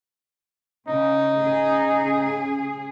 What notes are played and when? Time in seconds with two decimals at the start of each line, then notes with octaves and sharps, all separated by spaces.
0.88 C#3 D#4
1.39 C#3 G#4